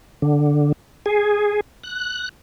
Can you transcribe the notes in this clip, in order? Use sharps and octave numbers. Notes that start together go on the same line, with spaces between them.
D3
G#4
F#6